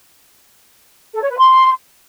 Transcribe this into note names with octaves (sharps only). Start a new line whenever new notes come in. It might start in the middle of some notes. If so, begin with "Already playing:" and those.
A4
C#5
B4
C6